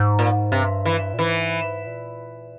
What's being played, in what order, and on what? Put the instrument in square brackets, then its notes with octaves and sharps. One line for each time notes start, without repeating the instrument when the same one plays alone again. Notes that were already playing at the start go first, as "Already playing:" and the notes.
Already playing: [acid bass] G#2
[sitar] A#2
[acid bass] G2 [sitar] C3
[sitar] E3
[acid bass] A#2
[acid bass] G#2 [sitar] E3
[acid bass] A#2